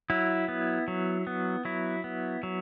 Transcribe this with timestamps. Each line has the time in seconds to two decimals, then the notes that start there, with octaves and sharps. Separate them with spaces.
0.10 F#3 E4
0.48 B3
0.88 F#3
1.27 B3
1.65 F#3 E4
2.04 B3
2.43 F#3